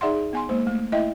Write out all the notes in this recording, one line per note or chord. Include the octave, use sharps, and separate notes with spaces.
D#4 G#4 D5 E5 F#5 C6
G#4
B3 G#5 C6
G#3 A#3 C5
A3
A3 E4 D#5 E5 G5